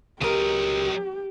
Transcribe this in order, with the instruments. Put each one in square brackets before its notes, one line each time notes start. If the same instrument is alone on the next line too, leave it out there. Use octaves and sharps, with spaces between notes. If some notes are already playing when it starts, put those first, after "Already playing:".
[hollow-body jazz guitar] C#2 A#4 [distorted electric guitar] F#3 D#5 [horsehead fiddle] G4